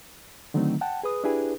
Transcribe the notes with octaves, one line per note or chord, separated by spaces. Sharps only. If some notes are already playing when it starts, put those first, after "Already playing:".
D3 D#3 F#3 A3 C4 D#4
F#5 G5 A5
G#4 B4 D#6
D4 E4 G4 G#4 B4